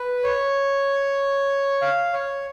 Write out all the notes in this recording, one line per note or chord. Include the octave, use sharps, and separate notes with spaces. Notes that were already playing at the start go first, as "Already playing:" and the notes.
Already playing: B4
C#5
F5
C#5